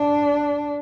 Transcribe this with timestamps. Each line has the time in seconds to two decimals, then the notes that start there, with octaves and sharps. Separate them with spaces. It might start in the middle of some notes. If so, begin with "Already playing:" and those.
Already playing: D4